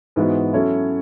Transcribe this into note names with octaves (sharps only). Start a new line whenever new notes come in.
G#2 E3 G#3 B3 F#4
F#3 C#4 E4 A4 C#5